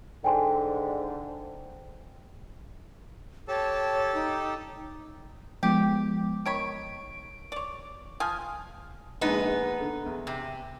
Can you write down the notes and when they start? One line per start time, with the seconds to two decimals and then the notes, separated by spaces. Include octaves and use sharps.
0.24 G#2 D3 G5 G#5 C6
3.48 G4 A4 C#5 A5
4.14 D#4
5.63 F3 G#3 B3 G4
6.46 D#3 C#5 B5 D7
7.52 C#5 D5
8.20 F3 G#5 D#6 F6
9.21 A#1 G#3 B3 D4 D#4
9.80 D3
10.06 E2
10.27 C3